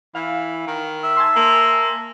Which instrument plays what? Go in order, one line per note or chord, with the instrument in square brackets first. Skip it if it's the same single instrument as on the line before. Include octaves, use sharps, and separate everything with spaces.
[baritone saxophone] E3 [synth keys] F5
[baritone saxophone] D#3
[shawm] E5
[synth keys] G#5 A5 C6
[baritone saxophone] A#3